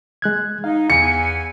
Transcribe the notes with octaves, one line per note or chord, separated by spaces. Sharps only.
G#3 F#6 G#6
D#4 F5
E2 G#5 C#7